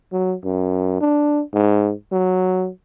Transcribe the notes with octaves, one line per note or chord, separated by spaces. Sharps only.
F#3
F#2
D4
G#2
F#3